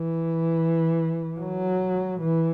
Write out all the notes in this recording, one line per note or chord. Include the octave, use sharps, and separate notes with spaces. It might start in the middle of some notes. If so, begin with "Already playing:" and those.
Already playing: E3
F#3
E3